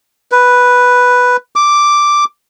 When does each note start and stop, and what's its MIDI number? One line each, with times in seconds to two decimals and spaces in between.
0.32 1.37 71
1.56 2.24 86